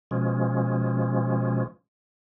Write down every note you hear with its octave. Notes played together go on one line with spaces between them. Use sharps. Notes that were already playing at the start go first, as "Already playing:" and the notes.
B2 F3 G#3 C#4